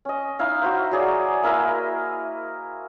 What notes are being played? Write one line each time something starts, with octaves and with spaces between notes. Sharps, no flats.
C#4 D#5
D#4 E4 F5
F#4 C5
F#3 G#4 D5
A#3 E4 A#4 D#5